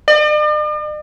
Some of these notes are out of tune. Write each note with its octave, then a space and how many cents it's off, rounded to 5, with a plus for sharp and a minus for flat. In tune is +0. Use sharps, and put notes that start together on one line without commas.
D5 +45